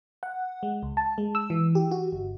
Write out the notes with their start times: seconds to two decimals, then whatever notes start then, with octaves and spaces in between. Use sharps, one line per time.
0.23 F#5
0.63 G#3
0.83 C#2
0.97 A5
1.18 G#3
1.35 E6
1.50 E3
1.75 G4
1.91 F#4
2.13 G1